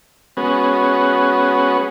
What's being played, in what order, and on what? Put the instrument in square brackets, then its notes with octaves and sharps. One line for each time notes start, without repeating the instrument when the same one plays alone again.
[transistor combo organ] G#3 B3 C#4 F#4